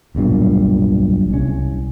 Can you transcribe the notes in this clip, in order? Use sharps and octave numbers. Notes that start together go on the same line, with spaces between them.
D1 B1 G2 A#2
C2 C#4